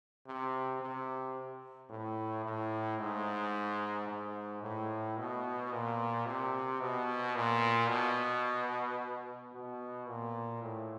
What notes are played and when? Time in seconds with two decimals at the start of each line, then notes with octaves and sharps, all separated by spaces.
0.27 C3
0.81 C3
1.90 A2
2.44 A2
2.99 G#2
4.07 G#2
4.62 A2
5.17 B2
5.72 A#2
6.26 C3
6.80 B2
7.35 A#2
7.90 B2
9.53 B2
10.08 A#2
10.63 A2